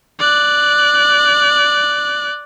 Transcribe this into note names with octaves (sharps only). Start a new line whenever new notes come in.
D5 F#6